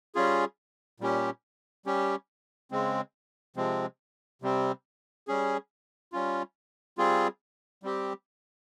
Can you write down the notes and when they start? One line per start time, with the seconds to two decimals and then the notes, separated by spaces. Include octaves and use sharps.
0.15 G3 C#4 F4 G#4
1.00 A#2 G3 C#4 G4
1.86 G3 C#4 G4
2.71 C#3 G#3 C4
3.56 C3 F3 G#3 C4
4.42 C3 G3 C4
5.28 G3 C#4 G#4
6.13 G3 C#4 F4
6.98 G3 C4 F4 G#4
7.83 G3 C4 G4